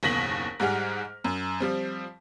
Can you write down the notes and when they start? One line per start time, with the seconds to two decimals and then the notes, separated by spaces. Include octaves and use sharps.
0.03 F#1 D#2 B2 A#6 B6 F#7
0.60 G#2 G3 G#4 F#5 F6
1.24 F#2
1.60 F3 G3 C4